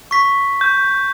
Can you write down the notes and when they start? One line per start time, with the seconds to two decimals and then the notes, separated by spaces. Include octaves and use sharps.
0.11 C#6 B6
0.61 G6